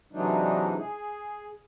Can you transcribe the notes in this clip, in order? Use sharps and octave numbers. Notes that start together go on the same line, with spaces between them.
C3 E3 F#3 G#3 D4 D#4
G#4